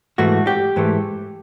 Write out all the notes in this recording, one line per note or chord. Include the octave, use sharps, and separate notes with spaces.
G#2 E3 A3 F#4
G4
G#2 E3 A3